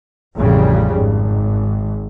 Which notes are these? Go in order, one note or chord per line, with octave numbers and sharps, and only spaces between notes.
A1 F2 C#3 G3
G#1